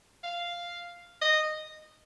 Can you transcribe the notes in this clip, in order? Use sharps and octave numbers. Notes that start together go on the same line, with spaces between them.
F5
D#5